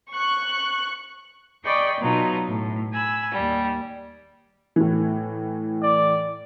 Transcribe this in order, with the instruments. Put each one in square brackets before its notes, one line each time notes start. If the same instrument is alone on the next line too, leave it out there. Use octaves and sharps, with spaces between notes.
[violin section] C#6 F#6
[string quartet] G#4 D5 D#5 G5 B5 C#6
B2 F#3 D#4 F4
A2
G#5 B5 E6
D#2 G3
[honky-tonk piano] A2 E3
[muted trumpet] D5